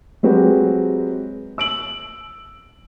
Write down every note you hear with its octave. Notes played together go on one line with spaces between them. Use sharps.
F#3 G#3 C4 F#4 G4 B4
E6 D7 F#7